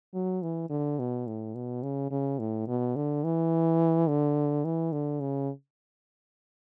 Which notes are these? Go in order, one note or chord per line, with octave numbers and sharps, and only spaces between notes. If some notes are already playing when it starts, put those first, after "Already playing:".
F#3
E3
D3
B2
A2
B2
C#3
C#3
A2
B2
D3
E3
D3
E3
D3
C#3